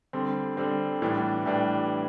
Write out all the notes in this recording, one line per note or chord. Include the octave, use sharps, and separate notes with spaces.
D3 G3 C4
D3 G3 C4
A2 E3 G3 D4
A2 E3 G3 D4